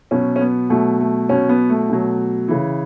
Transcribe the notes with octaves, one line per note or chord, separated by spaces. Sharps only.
B2 F#3 C#4
C#4
B3
B2 F#3 A3
A3
B2 F#3 C#4
B3
A3
B2 F#3
C#3 E3